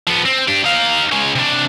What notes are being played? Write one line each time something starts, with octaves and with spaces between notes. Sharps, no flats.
F3 B3
C4
D4 G4
D#4 F5
G#3 C#4
C3 D4